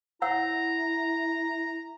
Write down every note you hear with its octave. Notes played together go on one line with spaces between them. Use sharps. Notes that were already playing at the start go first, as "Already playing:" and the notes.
E4 C#5 F#5 A#5 E6